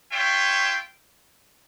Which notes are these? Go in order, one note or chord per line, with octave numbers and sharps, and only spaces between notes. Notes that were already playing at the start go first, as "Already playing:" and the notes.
F4 C#5 E5 G5